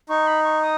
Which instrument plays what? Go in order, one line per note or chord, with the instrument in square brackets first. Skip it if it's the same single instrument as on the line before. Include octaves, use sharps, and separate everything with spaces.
[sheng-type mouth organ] D#4 [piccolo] C#6
[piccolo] B5
C#6
D#6